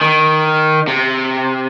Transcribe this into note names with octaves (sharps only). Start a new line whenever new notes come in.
D#3
C3